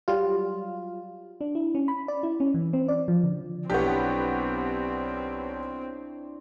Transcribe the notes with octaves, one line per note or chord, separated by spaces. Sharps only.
F#3 G3 F4
D4
E4
C#4
B5
D5
E4
C#4
E3
C4
D5
F3
D3
B1 B3 C4 D4 E4 G4 C#5